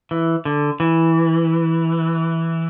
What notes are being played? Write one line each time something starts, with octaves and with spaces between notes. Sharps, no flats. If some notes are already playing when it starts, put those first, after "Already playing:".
E3
D3
E3